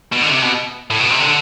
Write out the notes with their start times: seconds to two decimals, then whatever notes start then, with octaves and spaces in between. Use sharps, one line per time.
0.13 B2
0.23 D3
0.31 C3
0.42 B2
0.90 A2
1.00 B2
1.10 C3
1.20 D3